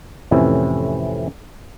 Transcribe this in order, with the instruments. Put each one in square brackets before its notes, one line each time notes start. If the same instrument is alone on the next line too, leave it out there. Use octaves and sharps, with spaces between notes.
[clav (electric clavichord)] F2 A2 C3 E3 C#4 E4